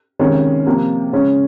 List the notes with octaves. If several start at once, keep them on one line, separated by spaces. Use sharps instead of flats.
C3 D#3 G#3 C#4
C3 F3 A#3
C#3 G#3 C#4